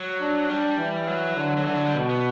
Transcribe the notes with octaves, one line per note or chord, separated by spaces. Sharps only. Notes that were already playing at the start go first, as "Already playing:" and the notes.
Already playing: F#3
D4
G3 D4
E3
F#3
D3
F#3
D3 E3
F#3
G3
B2
B3